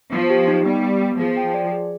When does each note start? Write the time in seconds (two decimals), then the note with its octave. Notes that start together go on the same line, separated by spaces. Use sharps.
0.12 F3 B3
0.30 G4
0.48 D#4
0.66 G3 B3
0.83 B3
1.01 B3
1.19 F3 G#4
1.37 G5
1.54 D5
1.72 G#4